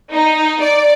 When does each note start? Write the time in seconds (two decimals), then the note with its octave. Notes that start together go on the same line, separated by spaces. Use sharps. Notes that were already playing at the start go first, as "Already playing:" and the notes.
0.12 D#4
0.60 D5